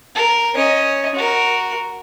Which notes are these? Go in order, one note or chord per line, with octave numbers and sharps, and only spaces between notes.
A#4
C#4 D#5
F#4 A#4